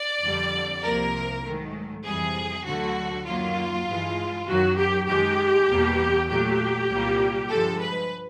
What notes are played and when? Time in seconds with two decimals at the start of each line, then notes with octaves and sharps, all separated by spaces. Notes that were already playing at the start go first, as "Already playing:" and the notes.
Already playing: D5
0.23 F2 D3 G3
0.83 C2 C3 F3 A#3 A#4
1.44 G#2 D#3 F#3 A3
2.04 F2 C3 E3 G3 G#4
2.65 D2 D3 F#3 A3 F#4
3.26 F#2 D#3 F#3 A#3 F4
3.86 G2 E3 G#3
4.47 F#2 D#3 F#3 F#4
4.77 G4
5.07 F#2 D#3 G#3 G4
5.68 E2 B2 G3 A#3
6.28 A#2 F#3 A3 G4
6.89 C2 A#2 G3 A#3
7.49 G2 D3 F3 G#3 A4
7.80 B4